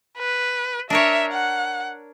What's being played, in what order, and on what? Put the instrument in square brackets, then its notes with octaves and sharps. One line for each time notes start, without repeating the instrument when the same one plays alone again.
[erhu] B4
[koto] D4 A#4 C#5 [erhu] E5
[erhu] F#5